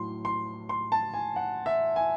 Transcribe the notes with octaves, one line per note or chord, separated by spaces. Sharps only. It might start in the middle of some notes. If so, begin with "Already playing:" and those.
Already playing: A2 F#3 C6
C6
C6
A5
G#5
F#5
E5
G#5